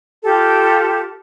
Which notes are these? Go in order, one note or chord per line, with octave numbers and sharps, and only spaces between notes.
F4 G4 A4